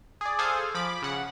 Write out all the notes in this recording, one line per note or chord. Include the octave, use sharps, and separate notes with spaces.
G#4 D5
G#4 A4 C5 F5 G#5
F3 B5 D6
C#3 F#5